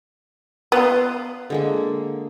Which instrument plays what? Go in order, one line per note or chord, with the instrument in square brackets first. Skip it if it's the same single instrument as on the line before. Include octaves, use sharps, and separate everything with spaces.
[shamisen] B3 [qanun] D5 F5 C6
[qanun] D3 G#3 A#3